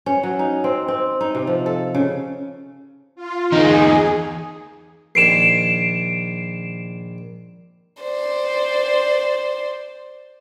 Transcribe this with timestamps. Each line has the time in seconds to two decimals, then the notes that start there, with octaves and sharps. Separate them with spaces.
0.06 C#4
0.23 F#3
0.39 D#4
0.64 C4
0.88 C4
1.21 D#4
1.35 C3
1.47 F3
1.66 A4
1.95 C#3
3.15 F4
3.52 E2 D#4 G#4
5.15 A#1 D#3 C7 D7 E7
8.01 C5 D5